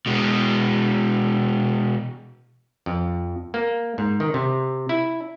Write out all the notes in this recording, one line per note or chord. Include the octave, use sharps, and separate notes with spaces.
B2 G#3
F2
A#3
G#2
D#3
C3
E4